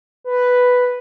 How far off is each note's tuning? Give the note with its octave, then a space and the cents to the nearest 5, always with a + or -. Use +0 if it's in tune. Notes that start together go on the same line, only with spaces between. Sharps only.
B4 +0